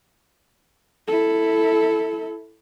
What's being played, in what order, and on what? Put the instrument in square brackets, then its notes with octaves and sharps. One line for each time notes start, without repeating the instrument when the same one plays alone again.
[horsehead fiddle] E4 A4